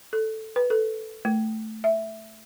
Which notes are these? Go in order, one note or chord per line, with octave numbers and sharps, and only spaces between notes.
A4
B4
A4
A3
E5